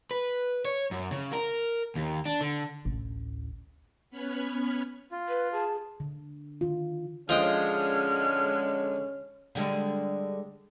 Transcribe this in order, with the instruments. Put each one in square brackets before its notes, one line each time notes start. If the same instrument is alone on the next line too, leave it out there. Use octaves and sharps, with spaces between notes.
[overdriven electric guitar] B4
C#5
F#2
C#3
A#4
D#2
D4
D3
[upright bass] A1 D2
[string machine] B3 C#4 B5 F6 F#6 G#6
[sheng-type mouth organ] F4
[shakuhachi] B4
[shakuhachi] G#4 [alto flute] A5
[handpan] D3
D#3 F4
[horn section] D3 G#3 [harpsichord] F3 D#5 G5 [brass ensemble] C#4 C#5 [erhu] F6
[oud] D3 G3 G#3